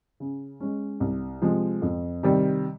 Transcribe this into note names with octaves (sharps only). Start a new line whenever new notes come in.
C#3
G#3 C#4
C2
C3 F3 G#3
F2
C3 D#3 G3